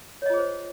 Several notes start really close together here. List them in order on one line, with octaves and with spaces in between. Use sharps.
C#5 D#5 F4 G#4 C5